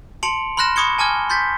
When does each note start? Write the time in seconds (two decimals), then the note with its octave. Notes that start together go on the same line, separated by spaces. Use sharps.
0.23 A5 C6 C#7 D7 F7 F#7
0.57 B5 C6 F6 F#6 A#6 E7
0.76 B5 C#6 D#6 G#6 C#7 G7
0.99 G#5 A5 D6 F6 G#6 G7
1.30 C6 G6 A6 B6